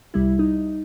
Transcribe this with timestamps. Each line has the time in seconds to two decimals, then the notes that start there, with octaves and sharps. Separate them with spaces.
0.14 C2 G3 E4
0.39 D#4